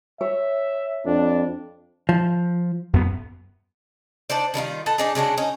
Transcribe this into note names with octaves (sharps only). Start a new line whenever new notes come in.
C#5 E5
F2 D4
F3
F#2 B3
D4 D#4 C5 D5
D#3 G3 D#4 F4
A4 B4 D#5
D4 D#4 G#4
C#3 G#3 D4 F#4
C#4 D#4